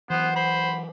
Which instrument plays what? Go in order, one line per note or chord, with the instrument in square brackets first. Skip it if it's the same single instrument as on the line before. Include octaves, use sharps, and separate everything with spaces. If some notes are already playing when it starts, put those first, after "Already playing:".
[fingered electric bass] E3 F#3 [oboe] B3 [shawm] C5 [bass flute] F#5
[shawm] C5 [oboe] B5